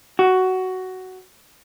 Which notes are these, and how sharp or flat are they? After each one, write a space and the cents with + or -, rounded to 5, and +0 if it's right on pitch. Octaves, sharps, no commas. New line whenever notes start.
F#4 +10